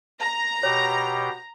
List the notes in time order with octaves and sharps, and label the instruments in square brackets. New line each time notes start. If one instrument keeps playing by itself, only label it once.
[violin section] A#5
[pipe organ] B2 G4 [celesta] C#5